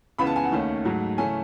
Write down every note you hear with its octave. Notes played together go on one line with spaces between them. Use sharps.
C#2 C#3 E3 B3 B5
A5
G#5
F#5
D#2 D#3 A3 C#4
G#2 F#3 A3
C#3 E3 A3 C#4 G#5